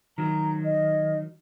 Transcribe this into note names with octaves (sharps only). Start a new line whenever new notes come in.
D#3 F#3 A#5
D#5